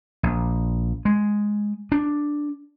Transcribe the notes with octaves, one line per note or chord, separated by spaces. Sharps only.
A#1
G#3
D4